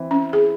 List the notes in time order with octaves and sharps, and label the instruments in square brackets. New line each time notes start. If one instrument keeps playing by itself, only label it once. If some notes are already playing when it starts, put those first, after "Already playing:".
Already playing: [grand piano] E3 C4 E4
[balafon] C#4
G#4